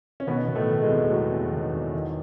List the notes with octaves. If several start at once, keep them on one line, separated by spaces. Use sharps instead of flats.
C#4
B2 D#3 B3
D#3
A2 A3
D#3
G#3
E2
E2 F#3
E2
D#3
E2
D#3